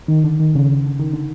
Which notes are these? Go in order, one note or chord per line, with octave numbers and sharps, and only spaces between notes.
D#3
D3
D#3
C#3
D3
D3
D#3
D3